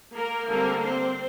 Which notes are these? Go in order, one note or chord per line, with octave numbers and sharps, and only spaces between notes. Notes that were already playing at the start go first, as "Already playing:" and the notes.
A#3 A#4
D3 G3 A#3 C4 A#4
C4 C5